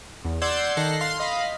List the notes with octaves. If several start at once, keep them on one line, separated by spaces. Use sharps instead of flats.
E2
D5 F#5 C6 E6 G6 G#6
D#3 A4 F#6 A#6 C7
F5 C6 C7
D#5 F5 B5